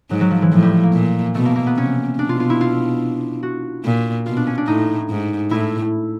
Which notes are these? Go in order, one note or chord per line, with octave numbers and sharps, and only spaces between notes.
G#2 F#3
F#3
F3
E3
A2 F3
G3
A3
A#3
A#2
B2 A3
A#3
A#3
B3
C3 C#4
B2 D4
F4
F4
E4
F4
F#4
A#2
B2 F4
D4
C#4
D4
A2 D#4
G#2
A2 E4